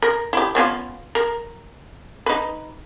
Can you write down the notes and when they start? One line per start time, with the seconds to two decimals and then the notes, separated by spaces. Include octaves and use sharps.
0.02 A#4
0.33 E4 G4
0.55 B3 C#4 F4
1.15 A#4
2.26 D#4 B4